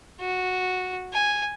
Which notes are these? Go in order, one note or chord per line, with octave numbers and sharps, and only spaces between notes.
F#4
G#5